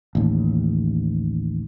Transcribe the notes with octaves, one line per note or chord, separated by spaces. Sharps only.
A1 D#2